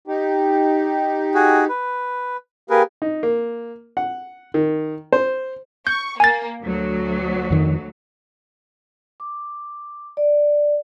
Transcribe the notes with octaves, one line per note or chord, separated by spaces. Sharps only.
D#4 G4
F#4 G#4
B4
A#3 G4 G#4 A#4 B4
D#4
A#3
F#5
D#3
C5
C#6 G6
A#3 G#5 A6
D2 F#3
F2 D#3
D6
D5